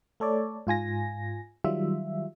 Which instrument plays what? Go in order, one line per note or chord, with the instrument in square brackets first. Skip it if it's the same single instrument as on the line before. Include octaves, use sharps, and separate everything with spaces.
[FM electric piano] A3 A4 C#5 D5
G#2 F4 G#5 A#6
D#3 F#3 G3 F4 E5